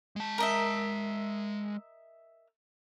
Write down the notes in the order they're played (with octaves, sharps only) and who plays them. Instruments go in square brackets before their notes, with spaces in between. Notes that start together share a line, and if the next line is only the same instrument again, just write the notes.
[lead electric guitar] G#3 A5
[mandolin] A#4 D#5 E5